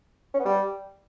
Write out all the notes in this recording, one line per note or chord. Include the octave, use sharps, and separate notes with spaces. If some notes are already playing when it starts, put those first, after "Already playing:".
C#4
B3
G3